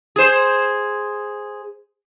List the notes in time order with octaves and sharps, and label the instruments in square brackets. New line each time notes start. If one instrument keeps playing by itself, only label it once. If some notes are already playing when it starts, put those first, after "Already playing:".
[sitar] G#4 C5